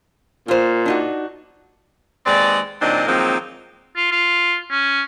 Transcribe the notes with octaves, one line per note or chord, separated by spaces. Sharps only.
A#2 F4 C5
D4 D#4 F#4
D#2 G#3 C4 B4 D5
A#2 D#3 F#3 C4 D4 D#5
D#3 F3 F#3 G#3 A#3 C4
F4
F4
C#4